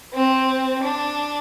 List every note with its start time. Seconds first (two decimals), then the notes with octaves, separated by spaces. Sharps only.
0.14 C4
0.84 D4